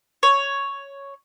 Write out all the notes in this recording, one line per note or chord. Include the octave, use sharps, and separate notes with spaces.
C#5